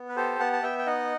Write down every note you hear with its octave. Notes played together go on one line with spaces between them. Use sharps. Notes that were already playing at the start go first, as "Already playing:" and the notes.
Already playing: B3
B4
G4 A4 C5
B3 F#5 A5
A5
B3 E5 G5
G5
D#4 D#5 F#5